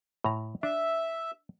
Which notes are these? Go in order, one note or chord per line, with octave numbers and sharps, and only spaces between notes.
A2 A#5
D4 E5